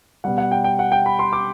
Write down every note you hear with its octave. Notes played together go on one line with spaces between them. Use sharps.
B2 G3 F#5
F#5
G5
G5
F#5
G5
B5
C6
D6